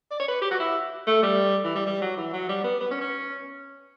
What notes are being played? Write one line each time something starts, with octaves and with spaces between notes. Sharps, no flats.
D5
C#5
B4
G4
F#4
E4
A3
G3
E3
G3
G3
F#3
E3
F#3
G3
B3
B3
C#4
C#4